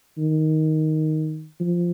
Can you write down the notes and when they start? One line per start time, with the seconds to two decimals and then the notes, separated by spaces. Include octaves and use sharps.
0.18 D#3
1.60 F3